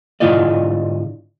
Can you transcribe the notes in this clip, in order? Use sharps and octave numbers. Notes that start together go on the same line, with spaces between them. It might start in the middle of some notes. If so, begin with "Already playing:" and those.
G#2 D3 E4 F4 D5 D#5